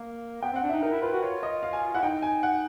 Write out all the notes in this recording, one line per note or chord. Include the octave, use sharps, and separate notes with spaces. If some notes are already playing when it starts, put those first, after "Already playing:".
Already playing: A#3
B3 G5
C4 F#5
D4
D#4 E5
D#4 A#4
E4
F4 B4
F#4
F4 C#5
D#5
F5
G#5
E4 F#5
D#4 G5
G#5
F#5